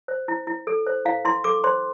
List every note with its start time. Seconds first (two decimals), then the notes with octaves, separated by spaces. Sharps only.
0.08 C5
0.28 E4
0.47 E4
0.67 A4
0.87 C5
1.05 E4 F5
1.25 E4 C6
1.44 A4 D6
1.64 C5 C6